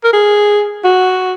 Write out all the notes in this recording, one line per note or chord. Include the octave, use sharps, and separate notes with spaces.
A#4
G#4
F#4